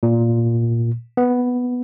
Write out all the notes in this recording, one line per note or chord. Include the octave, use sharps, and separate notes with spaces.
A#2
B3